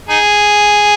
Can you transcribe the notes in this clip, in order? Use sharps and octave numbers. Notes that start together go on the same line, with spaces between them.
D#4 G#4